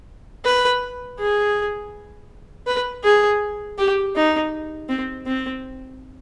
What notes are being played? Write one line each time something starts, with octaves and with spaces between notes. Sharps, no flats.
B4
G#4
B4
G#4
G4
D#4
C4
C4